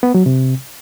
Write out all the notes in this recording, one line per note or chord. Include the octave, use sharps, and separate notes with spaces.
B3
F#3
C3